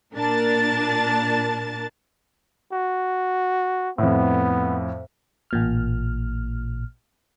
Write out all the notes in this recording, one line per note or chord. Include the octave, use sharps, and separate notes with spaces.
A#2 D4 A#4 A5 A6
F#4
F2 A2 B3
A1 A#2 F6